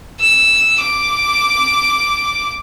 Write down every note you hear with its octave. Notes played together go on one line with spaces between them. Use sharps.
E6
D6